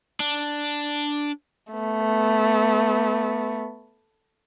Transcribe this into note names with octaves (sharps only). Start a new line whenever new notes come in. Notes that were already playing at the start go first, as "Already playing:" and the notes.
D4
A3 B3